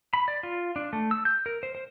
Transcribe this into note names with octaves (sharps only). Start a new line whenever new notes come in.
B5
D5
F4
D4
A3
E6
G6
A#4
C5
C5